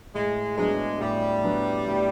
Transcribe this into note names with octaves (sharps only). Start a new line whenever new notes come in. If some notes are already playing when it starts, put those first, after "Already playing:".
A2 G#3
F#3 G#3 B3 D4
A2 G3
F#3 B3 D4
A2